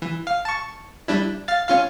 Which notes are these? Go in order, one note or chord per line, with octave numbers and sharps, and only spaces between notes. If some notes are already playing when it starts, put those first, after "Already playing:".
E3
F5
A5 C#6
G3 D4 E4
F5 A6
C#4 F4 F5